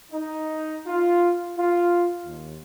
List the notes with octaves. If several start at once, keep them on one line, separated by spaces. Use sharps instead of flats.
D#4
F4
F4
D#2